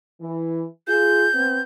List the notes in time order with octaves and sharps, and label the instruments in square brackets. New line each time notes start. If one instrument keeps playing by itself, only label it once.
[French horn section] E3
[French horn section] F4 G#4 [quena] G6
[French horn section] B3 C4